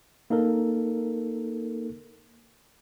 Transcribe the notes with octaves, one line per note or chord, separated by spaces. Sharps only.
A#3 D#4 A4 A#4